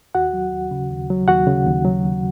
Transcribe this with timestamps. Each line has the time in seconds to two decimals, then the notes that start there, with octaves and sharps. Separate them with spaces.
0.15 D#2 F#4 F#5
0.33 F#3
0.53 D#2
0.71 C#3
0.90 D#2
1.10 F#3
1.28 D#2 F#4 F#5
1.47 C#3
1.67 D#2
1.85 F#3
2.03 D#2